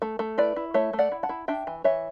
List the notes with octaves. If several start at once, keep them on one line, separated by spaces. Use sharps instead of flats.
A3
A3
E4 B4 D5
E4
A3 C#5 E5
A3
D5 F#5
E4
F#5 A5
E4
D4 E5 G5
E3
E3 C#5 E5